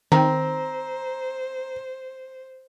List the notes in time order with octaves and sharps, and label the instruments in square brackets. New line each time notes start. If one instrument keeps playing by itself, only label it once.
[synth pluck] D#3 [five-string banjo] C4 [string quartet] C5 [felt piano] A#5